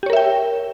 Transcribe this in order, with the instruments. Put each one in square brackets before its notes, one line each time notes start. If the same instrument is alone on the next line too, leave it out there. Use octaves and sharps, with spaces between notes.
[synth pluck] G4
C#5
A#4
E5
G5